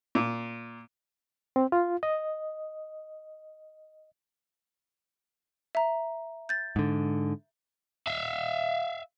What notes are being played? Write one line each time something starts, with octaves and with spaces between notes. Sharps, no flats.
A#2
C4
F4
D#5
E5 A#5
G6 A6
G#2 D3
E5 F5